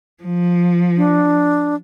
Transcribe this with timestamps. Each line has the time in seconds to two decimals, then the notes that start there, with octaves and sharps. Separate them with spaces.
0.23 F3
0.97 D4